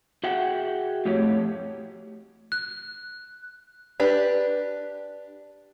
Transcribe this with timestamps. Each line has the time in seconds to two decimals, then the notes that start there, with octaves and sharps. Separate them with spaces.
0.24 F#4 G#4 E5 F#5 G5
1.05 F2 A2 A3 G4 C#5
2.52 F#6
4.00 D4 G4 B4